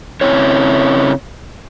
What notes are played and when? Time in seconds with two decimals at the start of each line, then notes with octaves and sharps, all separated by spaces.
0.21 C#3 C4 C#4 E4 C#5